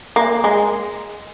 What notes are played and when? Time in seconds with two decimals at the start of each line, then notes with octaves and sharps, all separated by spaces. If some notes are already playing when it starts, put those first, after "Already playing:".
0.16 A#3
0.44 G#3